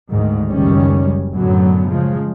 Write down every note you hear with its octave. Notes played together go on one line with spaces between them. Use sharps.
D2 G#2 D#3
F#1 C#2 D#3 G3 C#4
F#2 A2 D3 F#3 B3
C#3 F3 G#3